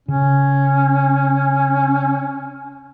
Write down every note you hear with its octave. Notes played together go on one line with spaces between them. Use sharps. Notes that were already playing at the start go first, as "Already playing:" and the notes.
C#3 C#4